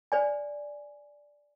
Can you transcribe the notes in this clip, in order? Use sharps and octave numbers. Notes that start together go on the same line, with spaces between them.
C5 D5 G#5